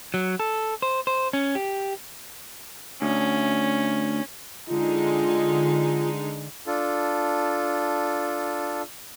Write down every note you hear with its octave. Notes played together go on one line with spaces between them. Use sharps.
F#3
A4
C5
C5
C#4
G4
D2 C#4
D3 G#3 D#4 F4
D4 F4 A4